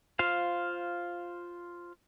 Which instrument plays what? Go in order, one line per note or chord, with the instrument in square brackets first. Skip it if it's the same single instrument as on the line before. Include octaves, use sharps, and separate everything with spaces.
[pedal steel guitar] F4 C5 F5